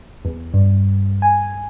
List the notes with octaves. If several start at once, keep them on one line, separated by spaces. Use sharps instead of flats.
E2
G2
G#5